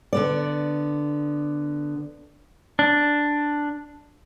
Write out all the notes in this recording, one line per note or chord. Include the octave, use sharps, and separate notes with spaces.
D3 B3 D5
D4